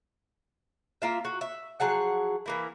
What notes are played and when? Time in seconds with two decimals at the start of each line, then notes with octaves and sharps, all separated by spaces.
1.02 A#3 F4 E5
1.25 F#4
1.41 E5
1.80 F3 F#3 G#4 F#5
2.46 E3 A#3 E4